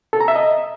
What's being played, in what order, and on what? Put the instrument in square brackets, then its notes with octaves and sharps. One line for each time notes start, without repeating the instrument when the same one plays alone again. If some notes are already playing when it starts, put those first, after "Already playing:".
[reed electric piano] A4
A#5
E5
D#5